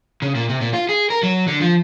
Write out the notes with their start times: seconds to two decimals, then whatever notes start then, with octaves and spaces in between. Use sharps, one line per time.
0.22 C#3
0.35 A#2
0.49 C3
0.61 A#2
0.74 F4
0.89 G#4
1.10 A#4
1.23 F#3
1.47 D3
1.61 F3